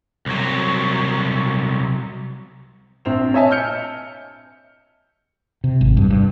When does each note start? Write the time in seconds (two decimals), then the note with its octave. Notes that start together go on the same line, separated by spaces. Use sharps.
0.26 C2 F#3
3.05 A#1 C4 F7
3.34 C#5 D#5 E5 G#5 A5
3.51 F6 G6 C#7
5.64 C3
5.81 G#1
5.97 G2
6.10 G2